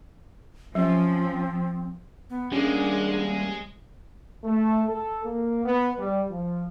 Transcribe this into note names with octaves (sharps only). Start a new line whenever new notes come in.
F3 F#3 C4 C#4
B3
G3 G#3 A#3 C#4 D4
A3
A4
A#3
B3
G3
F3